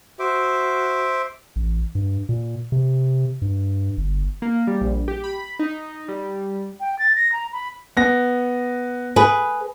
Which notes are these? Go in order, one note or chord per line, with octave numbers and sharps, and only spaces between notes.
F#4 C5 E5 D6
A1
G2
A#2
C3
G2
G1
A#3
G3
A#1
G4
B5
D#4
G3
G5
A6
A#6
A#5
B5
B3 A#6
G#4 B4